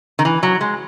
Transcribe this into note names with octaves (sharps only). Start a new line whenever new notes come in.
D#3
E3
F#3
G#3